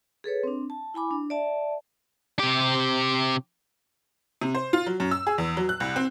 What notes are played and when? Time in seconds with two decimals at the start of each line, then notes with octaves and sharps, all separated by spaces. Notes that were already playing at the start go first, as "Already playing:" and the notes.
0.24 G#4 A4 B4 C#5
0.43 C4 D4
0.70 A5
0.94 E4 G#5 B5 D6
1.11 D4
1.30 D5 E5 A5
2.39 C3 G4
4.41 C3
4.55 C5
4.73 F4
4.86 F#3
5.00 F#2
5.11 E6
5.27 G#4
5.38 E2
5.57 F#3
5.69 F#6
5.80 C2
5.96 C4